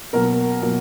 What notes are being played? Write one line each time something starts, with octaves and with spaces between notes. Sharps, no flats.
B2 F#3 A#3 A#4
B2 F#3 A#3